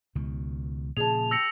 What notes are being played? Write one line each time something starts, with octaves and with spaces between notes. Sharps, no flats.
C#2 B2 D#3
A#2 C#3 F3 G#4 A5 F7
G4 E6 A#6 C#7